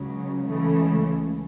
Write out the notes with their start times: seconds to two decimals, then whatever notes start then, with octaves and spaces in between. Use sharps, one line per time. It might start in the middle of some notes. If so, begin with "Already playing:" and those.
Already playing: C#2 C#3 F#3
0.47 C#2 C#3 E3 A3